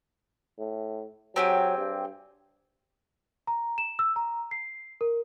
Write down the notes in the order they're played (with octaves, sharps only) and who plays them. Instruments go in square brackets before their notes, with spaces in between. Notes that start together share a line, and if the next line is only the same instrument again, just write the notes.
[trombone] A2
[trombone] F#3 [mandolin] C4 G4 G#4
[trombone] G2
[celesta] A#5
E7
E6
A#5
C7
A#4